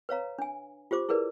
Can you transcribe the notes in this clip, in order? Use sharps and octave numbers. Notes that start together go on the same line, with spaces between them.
B4 C#5 F5 A#5
D4 G#5
F4 G4 C5 D6
E4 G#4 A#4 B4 D5